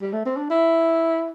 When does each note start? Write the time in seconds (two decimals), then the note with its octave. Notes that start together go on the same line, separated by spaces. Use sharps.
0.02 G3
0.13 A3
0.26 C4
0.37 D4
0.50 E4